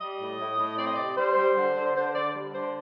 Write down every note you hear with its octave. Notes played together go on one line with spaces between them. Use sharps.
G3 D#5
A2
A2
A2
C4 D5
D#5
C3 D5
G3 C5
G3
D3
D3
D3 C5
D3 D5
G3
D3 C5